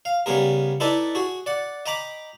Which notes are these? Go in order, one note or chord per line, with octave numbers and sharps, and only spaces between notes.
F5
C#3 G3 B3 G#4 A#4
D#4 E4 A4 B4 D5 D#5
F#4 G#4
D5 F#5
D#5 G5 A#5 B5 D6